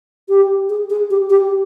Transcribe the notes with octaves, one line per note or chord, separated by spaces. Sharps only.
G4
G#4
G#4
G4
G4